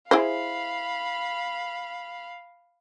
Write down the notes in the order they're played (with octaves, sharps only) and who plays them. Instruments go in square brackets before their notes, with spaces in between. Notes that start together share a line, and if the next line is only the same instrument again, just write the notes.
[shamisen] E4 G#4 C5 [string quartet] F5 B5